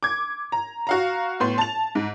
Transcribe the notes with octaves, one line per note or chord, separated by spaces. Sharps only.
D6 G#6
A#5
F#4 F5 A#5
A2 B3 C6
A5 F7
G#2